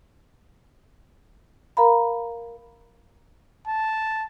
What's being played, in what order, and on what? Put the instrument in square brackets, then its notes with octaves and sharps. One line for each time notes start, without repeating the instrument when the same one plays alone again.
[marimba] A#4 F5 A#5 B5
[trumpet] A5